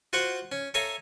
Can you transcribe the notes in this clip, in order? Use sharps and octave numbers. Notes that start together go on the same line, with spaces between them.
F4 F#4 C5 F#5 C#6 D6
C#4
A4 C#5 E5 F5 G#5 A#5